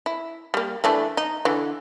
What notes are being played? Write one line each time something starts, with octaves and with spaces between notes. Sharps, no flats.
E4
G3 A#3
E3 A3 D4
D#4
D3 E3